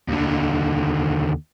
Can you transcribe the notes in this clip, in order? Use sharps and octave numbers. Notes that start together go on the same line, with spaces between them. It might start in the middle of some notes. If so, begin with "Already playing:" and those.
D#2 D3